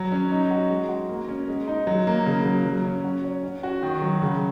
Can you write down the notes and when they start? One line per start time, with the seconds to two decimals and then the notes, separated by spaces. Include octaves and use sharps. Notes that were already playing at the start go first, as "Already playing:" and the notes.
Already playing: F#3
0.12 C#4
0.31 D#4
0.51 F#4
0.70 G#3
0.89 F#4
1.09 A#3
1.28 C#4
1.48 G#3
1.67 D#4
1.87 F#3
2.07 A#3
2.26 C#3
2.46 F#3
2.65 F#3
2.85 C#4
3.04 F#4
3.24 C#5
3.43 C#4
3.63 F#4
3.83 D#3
4.02 F#3
4.22 C#3